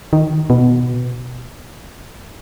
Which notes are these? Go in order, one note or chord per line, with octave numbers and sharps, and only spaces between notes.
D#3
B2